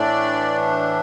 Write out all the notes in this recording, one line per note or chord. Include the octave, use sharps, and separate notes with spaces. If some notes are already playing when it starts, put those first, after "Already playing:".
Already playing: A2 E3 A3 D4 D5